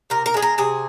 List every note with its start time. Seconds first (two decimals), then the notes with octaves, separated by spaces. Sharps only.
0.10 C3 A#4
0.26 A#4
0.34 G#3 G#4
0.42 A#4
0.58 C3 G#4